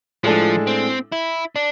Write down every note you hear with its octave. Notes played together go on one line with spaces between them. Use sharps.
A2 F3 G#3 D4 A4
C4
E4
D4